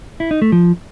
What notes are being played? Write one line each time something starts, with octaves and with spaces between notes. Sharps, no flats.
E4
D#4
A3
F3